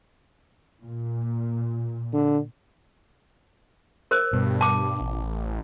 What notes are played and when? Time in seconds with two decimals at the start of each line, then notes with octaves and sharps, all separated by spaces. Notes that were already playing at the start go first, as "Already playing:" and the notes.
0.83 A#2
2.13 D3
4.11 A#4 C5
4.33 G2 B2
4.61 A5 D6
5.01 A1